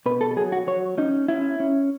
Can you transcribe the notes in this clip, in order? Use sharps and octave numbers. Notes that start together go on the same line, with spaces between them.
B2 B4
A4
A4
F#3 G#4
F#4
F#3 C#5
C#4 D#4
C#4 E4
C#4